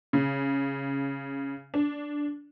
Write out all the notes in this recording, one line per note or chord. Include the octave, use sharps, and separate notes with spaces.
C#3
D4